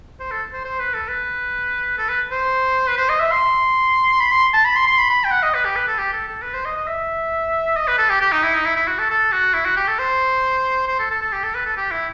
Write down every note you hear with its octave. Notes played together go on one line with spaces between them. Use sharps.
C5
A4
C5
C5
B4
A4
B4
A4
B4
C5
B4
C5
D#5
E5
C6
B5
C6
A5
B5
C6
C6
B5
B5
G5
F#5
D#5
B4
G4
B4
A4
G4
A4
A4
B4
C5
D#5
D#5
E5
D#5
B4
A4
G4
G4
D#4
E4
D#4
E4
E4
F#4
A4
A4
F#4
E4
F#4
G4
A4
C5
C5
A4
A4
A4
G4
A4
B4
A4
G4
E4